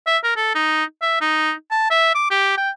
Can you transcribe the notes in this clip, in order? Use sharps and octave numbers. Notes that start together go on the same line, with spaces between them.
E5
A#4
A4
D#4
E5
D#4
A5
E5
D6
G4
G5